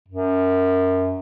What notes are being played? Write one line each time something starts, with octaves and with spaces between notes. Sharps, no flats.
F#2